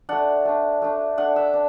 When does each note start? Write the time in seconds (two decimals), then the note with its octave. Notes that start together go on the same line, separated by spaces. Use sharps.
0.09 A3 D4 F#5
0.45 A3 D4
0.82 A3 D4
1.17 A3 D4 F#5
1.36 E5
1.53 D4